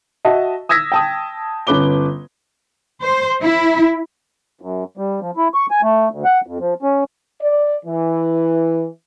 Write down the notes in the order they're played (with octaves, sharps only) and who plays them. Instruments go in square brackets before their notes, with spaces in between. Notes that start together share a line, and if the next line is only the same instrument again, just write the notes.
[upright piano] F#4 D#5 E5 A5
D#6 E6 G#6 A#6 B6
G5 A5 D#6
G1 C#4 B4 D6 G7
[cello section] C5
E4
[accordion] F#2
G3
F3
E4
C#6
G#5
A3
D2
F#5
F2
F3
C#4
[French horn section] D5
E3